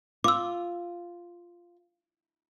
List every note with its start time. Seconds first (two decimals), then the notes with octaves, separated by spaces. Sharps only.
0.24 F4 D6 E6